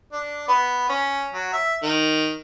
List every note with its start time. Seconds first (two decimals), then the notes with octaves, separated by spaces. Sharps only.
0.12 D4
0.48 B3
0.89 C#4
1.34 F#3
1.53 E5
1.83 D#3